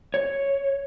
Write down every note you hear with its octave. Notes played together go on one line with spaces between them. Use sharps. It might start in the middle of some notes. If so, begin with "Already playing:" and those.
C#5